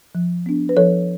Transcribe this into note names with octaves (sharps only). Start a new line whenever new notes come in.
F3
B3 D4
B4
F3 A4 C#5